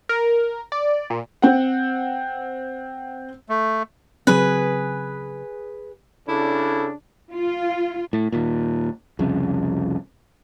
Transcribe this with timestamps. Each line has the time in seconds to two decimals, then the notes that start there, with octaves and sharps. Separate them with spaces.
0.09 A#4
0.72 D5
1.10 A#2
1.42 C4 F#5
3.49 A3
4.27 C#3 F#3 C4 G#4 B4
6.28 C#3 D4 E4 A4
7.33 F4
8.13 A2
8.32 D#2 A#2
9.19 C2 F2 C#3